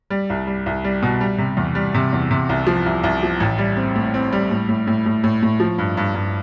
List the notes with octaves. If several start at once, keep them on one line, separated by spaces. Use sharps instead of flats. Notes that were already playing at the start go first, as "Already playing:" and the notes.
G3
C2
G3
C2
G3
B2
G3
C3
E2
G3
C3
E2
C3
C2
F3
C2
C2
F3
A1
G3
C4
A2
C4
G3
A2
A2
A2
A2
A2
A2
F3
G2
G2
G2